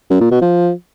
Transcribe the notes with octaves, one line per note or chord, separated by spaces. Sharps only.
F#2
A#2
B2
F3